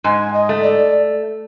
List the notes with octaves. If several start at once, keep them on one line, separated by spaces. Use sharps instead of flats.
G#2 G#5
D#5
A3
D5